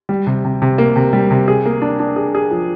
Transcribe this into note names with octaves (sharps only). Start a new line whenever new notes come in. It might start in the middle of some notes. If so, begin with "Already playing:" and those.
G3
C3
C3
C3
A#3
C3
G3
C3
G#4
A#3
D4
D4
G#4
G#4
F3